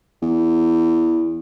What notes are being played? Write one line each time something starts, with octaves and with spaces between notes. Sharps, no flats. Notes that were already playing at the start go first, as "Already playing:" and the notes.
E2